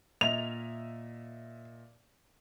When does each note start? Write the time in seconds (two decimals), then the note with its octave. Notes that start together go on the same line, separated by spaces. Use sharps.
0.21 A#2 D#5 E5 F7